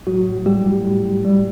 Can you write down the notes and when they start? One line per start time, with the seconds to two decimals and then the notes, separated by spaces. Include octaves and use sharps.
0.07 A2 F#3 F#4
0.27 A2
0.46 G3 G4
0.66 A2
0.85 A2
1.06 A2
1.25 G3